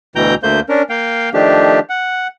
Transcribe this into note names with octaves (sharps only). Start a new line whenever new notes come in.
D2 B2 E3 G5 A#5 G6
D2 A3 A#3 C5 G6
C#4 D4 A#4
A#3 F5 G5
D#3 F3 A3 D4 G4
F#5